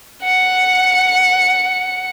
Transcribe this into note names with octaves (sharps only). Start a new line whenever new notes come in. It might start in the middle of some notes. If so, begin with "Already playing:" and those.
F#5 C#7